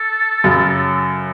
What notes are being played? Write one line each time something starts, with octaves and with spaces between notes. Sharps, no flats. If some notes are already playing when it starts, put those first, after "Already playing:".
Already playing: A4
F#2 C#3 F#3